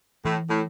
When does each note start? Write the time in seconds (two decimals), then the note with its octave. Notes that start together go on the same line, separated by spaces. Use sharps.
0.24 A2 E3
0.49 A2